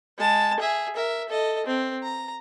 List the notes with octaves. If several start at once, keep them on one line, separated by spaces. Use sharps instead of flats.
G#3 A5
G#4 E5
A#4 E5
A4 D#5
C4
A#5